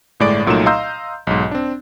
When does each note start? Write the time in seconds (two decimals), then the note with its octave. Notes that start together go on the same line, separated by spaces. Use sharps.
0.20 G1 A2 G#3 D5 D7
0.46 C2 A#2 F#3 A3 D#4 E7
0.66 D#5 F5 A#5 C6 E6 G6
1.27 B1 G#2
1.51 C4 D4